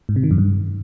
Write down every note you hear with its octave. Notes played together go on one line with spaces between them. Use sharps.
G#2
C3
D#3
F#2
G2